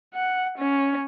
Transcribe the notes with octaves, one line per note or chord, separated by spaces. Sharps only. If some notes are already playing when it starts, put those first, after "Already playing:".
F#5
C#4